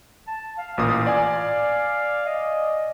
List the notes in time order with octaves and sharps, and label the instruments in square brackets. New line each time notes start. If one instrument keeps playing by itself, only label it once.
[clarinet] A5
F5
[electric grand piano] A1 A#2 D#6
D5 G#5
[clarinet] D#5